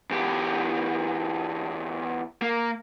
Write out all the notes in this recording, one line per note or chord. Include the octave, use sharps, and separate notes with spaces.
E2 G4
A#3